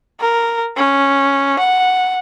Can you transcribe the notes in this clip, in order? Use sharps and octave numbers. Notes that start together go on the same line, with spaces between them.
A#4
C#4
F#5